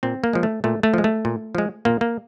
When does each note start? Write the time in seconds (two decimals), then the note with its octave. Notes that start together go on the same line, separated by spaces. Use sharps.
0.03 A#2 C4
0.24 A#3
0.33 F3 G#3
0.43 A3
0.64 A#2 A3
0.83 A3
0.94 F3 G#3
1.04 A3
1.25 A#2
1.55 F3 G#3
1.85 A#2 A#3
2.01 A#3